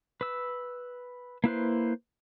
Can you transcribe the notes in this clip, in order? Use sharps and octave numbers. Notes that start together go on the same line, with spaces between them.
B4 E6
A#3 E4 B4 C5